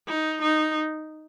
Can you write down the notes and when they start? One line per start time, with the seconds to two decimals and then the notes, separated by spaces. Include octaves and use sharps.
0.08 D#4
0.42 D#4